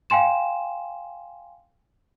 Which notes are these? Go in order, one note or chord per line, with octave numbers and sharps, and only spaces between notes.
F5 G5 G#5 C6 E7